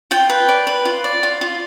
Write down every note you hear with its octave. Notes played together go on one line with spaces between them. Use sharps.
F4 G5
B4
D5
B4
F4
D5
F4
F4